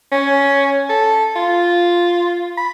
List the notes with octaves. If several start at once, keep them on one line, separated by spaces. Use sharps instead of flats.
C#4
A4
F4
B5